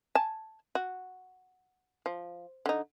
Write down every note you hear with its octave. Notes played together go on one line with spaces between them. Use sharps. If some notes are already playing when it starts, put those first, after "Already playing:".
G#5 A5
F#4
F3
D3 D#4